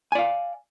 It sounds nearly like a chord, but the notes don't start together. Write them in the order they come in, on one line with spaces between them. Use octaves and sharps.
G#5 D5 F5